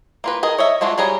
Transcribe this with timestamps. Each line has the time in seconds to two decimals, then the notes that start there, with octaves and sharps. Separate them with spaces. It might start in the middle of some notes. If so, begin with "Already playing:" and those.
0.24 A#3 F4 B4
0.43 G#4 A#4 D#5
0.58 C#5 D#5 E5
0.81 G#3 A3 D4 F4 F#4
0.98 F#3 G3 G#4 A#5